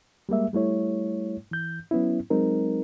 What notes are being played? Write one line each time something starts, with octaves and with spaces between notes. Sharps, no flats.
G3 G#3 A#3 E5
G3 A3 E4 C#5
E3 G6
F#3 B3 C#4 E4
F#3 G#3 C4 D#4 A#4